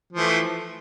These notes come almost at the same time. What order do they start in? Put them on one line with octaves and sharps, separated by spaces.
F3 E3 A3